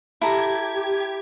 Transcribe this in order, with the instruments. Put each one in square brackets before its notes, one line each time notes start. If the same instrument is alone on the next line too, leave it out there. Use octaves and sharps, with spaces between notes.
[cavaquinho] E4 A4 A#5 [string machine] G4 G#6